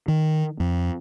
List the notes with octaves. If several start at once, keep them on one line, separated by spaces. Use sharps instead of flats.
D#3
F2